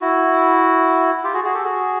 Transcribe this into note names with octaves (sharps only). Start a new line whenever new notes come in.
E4 F#4
F4 G4
F#4 G#4
F#4 G#4
G4 A4
F#4 G#4